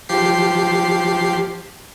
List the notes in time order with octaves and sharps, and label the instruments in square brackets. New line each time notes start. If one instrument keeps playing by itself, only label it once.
[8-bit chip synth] F3 G4 C7